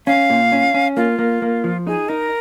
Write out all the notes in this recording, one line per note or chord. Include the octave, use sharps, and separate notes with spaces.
C#4 F5
A#2
C#4
C#4
A#3 F4
A#3
A#3
F3
D#4 G#4
D#4 A#4